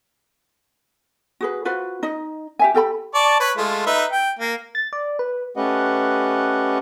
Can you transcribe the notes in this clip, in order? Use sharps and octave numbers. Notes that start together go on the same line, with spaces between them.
F#4 G#4 B4
F4 F#4 B4 C5
D#4 D#5
G4 E5 G#5
G4 A4 G5 B5
D5 A5 C#6
B4 C#5
G#3 A3 F4
D#4 B4 E5
G5
A#3
A6
D5
B4
A3 C#4 G4 B4 D#5 F#5